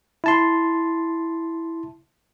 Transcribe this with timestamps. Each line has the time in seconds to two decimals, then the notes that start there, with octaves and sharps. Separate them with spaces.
0.24 E4 A5 C6